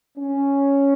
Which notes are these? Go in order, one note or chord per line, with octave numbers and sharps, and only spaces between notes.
C#4